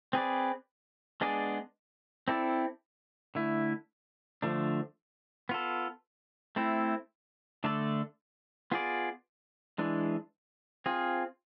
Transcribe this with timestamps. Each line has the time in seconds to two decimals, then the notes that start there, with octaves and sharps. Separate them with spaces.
0.13 C4 G#4 B4 D5
1.21 G#3 B3 D4 G#4 D5
2.28 C4 E4 A4 D5
3.35 D3 A3 E4
4.42 D3 F3 A3 D4
5.49 B3 F4 A4
6.56 A3 C4 E4
7.64 D3 A3 D4 A4 D5
8.72 B3 F4 G#4 D5
9.78 E3 G#3 D4
10.86 C4 F4 G#4